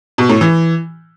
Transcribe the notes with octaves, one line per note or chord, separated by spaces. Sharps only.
B2
A2
E3